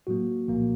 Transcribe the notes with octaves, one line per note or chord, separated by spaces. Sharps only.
A2 F#3 A#3 F#4
C2 A#2 F3 A#3